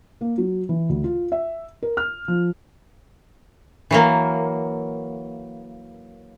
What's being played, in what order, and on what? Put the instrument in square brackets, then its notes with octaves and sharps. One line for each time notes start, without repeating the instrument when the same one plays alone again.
[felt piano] A#3
F#3
E3
D2
F4
E5
A#4
F6
F3
[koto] E3 F#3 A#3